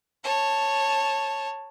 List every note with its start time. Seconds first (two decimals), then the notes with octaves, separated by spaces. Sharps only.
0.22 C#5 A5